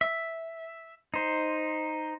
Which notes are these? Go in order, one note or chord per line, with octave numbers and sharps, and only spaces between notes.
E5
D#4 C5